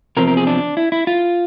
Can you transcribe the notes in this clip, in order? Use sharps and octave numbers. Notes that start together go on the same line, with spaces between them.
E2 C3 F3 C4 A#4
A#4
G#4
D4
E4
E4
F4